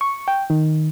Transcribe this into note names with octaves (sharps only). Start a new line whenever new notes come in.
C#6
G5
D#3